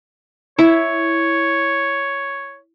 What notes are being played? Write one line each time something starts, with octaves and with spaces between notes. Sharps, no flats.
E4 C#5